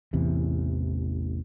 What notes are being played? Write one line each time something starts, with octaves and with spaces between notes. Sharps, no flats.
A1 E2 C3 E3